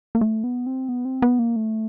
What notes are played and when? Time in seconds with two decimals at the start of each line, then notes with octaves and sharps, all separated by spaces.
0.15 A#3
0.21 A3
0.44 B3
0.67 C4
0.89 B3
1.05 C4
1.22 B3
1.39 A#3
1.56 A3